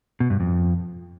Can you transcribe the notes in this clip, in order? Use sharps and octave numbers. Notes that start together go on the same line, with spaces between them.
B2
G2
F2